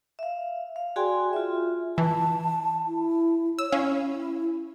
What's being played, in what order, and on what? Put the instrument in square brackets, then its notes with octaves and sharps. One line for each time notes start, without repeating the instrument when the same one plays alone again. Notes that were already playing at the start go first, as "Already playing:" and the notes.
[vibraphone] E5 F5
F5
F#4 G#4 D5 G5 G#5 C6
F4 E5
[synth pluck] E3 [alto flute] A5
[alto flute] E4
[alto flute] C#5 [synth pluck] E6
[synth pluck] C#4 F5 [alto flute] E4